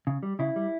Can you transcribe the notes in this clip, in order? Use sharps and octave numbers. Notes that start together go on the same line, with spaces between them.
C#3
G3
C#3 E4
G3